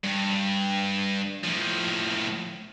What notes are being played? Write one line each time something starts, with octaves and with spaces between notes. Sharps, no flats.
G2
A2 F3